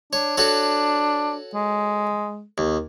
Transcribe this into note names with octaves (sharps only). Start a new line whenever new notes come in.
D4 C#5
D4 F#4 A4 C#5
G#3
D#2